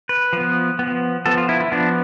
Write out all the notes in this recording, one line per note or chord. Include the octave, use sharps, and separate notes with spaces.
B4
F3 B3
F3 B3
F3 B3 A4
F4
E4
E4
F3 B3 D4